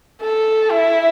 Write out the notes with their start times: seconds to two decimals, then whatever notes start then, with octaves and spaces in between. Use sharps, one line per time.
0.22 A4
0.71 E4